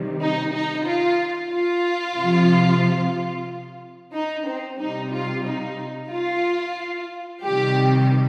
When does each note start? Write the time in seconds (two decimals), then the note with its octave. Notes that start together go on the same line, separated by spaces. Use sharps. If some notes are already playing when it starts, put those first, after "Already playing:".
Already playing: C3 D#3 G3
0.19 D#4
0.52 D#4
0.85 F4
1.51 F4
2.17 C3 F3
4.14 D#4
4.46 C4
4.79 C3 G3 D#4
5.13 F4
5.46 D#4
6.11 F4
7.43 C3 D#3 G3 G4